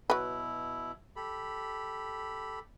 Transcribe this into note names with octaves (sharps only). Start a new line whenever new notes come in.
B2 F#3 E4 B4
G4 A4 B5